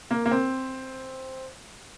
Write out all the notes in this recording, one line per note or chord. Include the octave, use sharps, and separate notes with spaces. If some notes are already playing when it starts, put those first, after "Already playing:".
A#3
A#3
C4